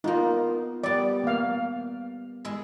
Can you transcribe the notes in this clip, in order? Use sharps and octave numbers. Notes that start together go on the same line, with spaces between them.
A#3 B3 D#4 F4
G3 B3 D5
A#3 F5
G#3 E4 E5